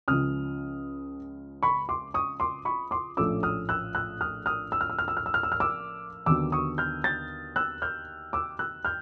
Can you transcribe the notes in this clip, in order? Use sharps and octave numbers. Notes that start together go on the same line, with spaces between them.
C#2 C#3 F3 D#6 F6
B5 C#6
C6 D6
C#6 D#6
C6 D6
B5 C#6
C6 D6
A#1 A2 F3 A3 C#4 D6 E6
D#6 F6
E6 F#6
E6 F#6
D#6 F6
D#6 F6
E6
F6
E6
F6
E6
F6
E6
F6
E6
F6
D6 E6
D#2 D3 F#3 B3 D6 E6
C#6 D#6
F6 G6
G6 A6
E6 F#6
F6 G6
D6 E6
E6 F#6
F6 G6